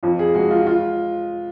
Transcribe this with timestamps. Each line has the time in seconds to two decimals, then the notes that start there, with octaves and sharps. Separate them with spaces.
0.03 F2 F4
0.19 G#4
0.34 G#3 F#4
0.50 F4
0.67 F4